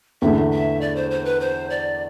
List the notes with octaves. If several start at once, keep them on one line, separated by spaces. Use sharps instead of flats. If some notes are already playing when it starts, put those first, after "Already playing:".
E2 D3 A3 E5
E5
D5
C5
C5
B4
C5
D5